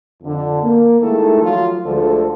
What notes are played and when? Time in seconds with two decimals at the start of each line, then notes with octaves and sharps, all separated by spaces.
0.23 F2 D3
0.62 A#3
1.01 D#3 G#3 A3 E4 A4
1.42 F3 F#3 F4
1.84 D2 D3 F3 G#3 A4